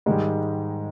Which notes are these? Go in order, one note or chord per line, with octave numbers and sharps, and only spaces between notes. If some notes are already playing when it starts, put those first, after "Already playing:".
G#2 D#3 G3 G#3